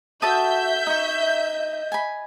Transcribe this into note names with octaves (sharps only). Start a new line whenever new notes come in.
F#4 A4 E5 A5 D#6 G6
D#4 D#5 C#6
G#5 B5